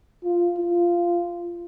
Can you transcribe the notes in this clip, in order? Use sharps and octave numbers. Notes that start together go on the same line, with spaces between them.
F4
F4